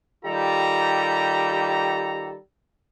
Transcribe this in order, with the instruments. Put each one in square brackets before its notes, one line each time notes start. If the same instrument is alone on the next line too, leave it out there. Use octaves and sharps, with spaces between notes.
[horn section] D#3 G3 F4 G4 A4 A#5